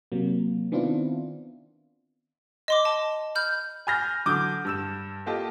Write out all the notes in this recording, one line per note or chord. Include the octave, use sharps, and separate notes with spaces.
C3 F#3 A#3
D#3 B3 C4 D4 E4 F4
D#5 C6 D6
A5
B5 F6 G6
G#5 B5 F6 G6 A#6
D3 F#3 D6 D#6 G6
G2 E6 E7
A#3 F4 G4 A4 D#5